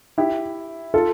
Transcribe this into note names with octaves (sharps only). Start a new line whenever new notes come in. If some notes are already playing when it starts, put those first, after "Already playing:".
E4 G4
F4 A4